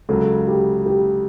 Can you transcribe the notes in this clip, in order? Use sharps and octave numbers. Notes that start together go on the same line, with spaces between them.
C#2 C#3 F#3 A4
G4
G4